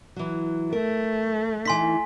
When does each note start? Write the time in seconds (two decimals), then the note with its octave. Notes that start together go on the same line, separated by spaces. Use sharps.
0.16 E3 F#3
0.72 A3 A#4
1.65 E3 D#4 G#5 C6 B6